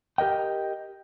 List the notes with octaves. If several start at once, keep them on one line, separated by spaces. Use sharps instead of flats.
G4 A#4 D#5 G5